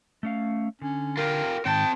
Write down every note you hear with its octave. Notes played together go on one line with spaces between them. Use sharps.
A3 C#4 F5
D3 C#4
F4 G4 A#4
G#2 D#3 C4 G5 A5